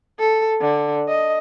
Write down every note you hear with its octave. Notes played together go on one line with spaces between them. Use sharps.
A4
D3
D#5